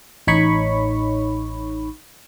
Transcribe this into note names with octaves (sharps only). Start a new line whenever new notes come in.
A1 D#4 C#5 B5 C#6